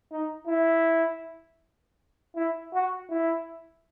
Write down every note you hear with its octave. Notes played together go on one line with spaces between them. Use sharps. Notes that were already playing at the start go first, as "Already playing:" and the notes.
D#4
E4
E4
F#4
E4